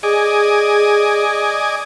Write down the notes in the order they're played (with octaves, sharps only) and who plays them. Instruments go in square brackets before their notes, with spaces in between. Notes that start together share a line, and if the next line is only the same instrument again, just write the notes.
[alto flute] G#4 [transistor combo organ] D5 D#5 G#5